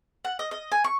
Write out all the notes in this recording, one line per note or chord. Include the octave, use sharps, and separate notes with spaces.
F#5
D#5
D#5
G#5
C#6